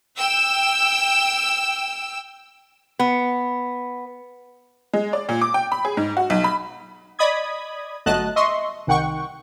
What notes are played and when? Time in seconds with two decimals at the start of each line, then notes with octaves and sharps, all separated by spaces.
0.17 G5 E6
2.99 B3
4.93 G#3
5.13 D5
5.29 A#2
5.42 D6
5.54 G5
5.72 B5
5.85 G#4
5.97 G#2
6.17 F#4
6.30 B1
6.44 B5
7.19 D5 D#5 B5 D#6 G#6
8.06 G1 F#3 A3 D#5 A5 F#6
8.36 D#5 E5 C6 C#6
8.87 C2 D#3 F#5 G5 C#6